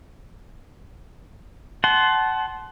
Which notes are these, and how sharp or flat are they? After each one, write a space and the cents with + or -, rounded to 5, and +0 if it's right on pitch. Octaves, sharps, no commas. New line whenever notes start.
F#5 +20 A5 -20 C6 +0